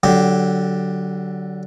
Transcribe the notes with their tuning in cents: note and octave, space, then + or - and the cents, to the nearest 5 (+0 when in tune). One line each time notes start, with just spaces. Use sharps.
D3 +0 F#3 +20 G4 +0